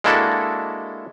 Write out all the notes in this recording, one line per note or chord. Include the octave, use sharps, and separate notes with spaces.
G#3 A#3 D4 E4 F#4 A4